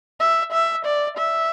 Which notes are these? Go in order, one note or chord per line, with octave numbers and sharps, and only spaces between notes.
E5
E5
D5
E5